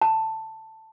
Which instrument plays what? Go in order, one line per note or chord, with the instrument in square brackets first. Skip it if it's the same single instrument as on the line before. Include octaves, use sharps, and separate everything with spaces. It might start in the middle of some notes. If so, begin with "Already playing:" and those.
[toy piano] A5